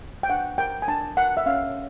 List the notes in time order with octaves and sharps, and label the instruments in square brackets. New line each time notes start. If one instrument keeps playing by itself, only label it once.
[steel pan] G5
D4 F#5
A#4 G5
G#5
D4 A5
A#4 F#5
E5
C#4 F5